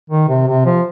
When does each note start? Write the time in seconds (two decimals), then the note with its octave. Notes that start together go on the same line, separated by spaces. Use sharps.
0.10 D#3
0.29 C3
0.47 C3
0.66 F3